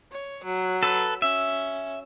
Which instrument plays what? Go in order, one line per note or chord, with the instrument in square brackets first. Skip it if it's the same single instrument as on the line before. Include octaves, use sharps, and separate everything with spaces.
[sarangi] C#5
F#3
[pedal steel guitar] A4 B4
[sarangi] C#4 [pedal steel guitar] E5